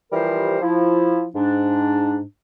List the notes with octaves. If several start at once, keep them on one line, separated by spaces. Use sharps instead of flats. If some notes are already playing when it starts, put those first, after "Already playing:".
E3 F3 G3 G4 A#4 C5
F3 E4
G#2 D4